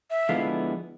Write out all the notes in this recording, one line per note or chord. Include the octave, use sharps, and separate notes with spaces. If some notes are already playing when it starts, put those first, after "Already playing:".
E5
D3 F3 G#3 B3 E4 F5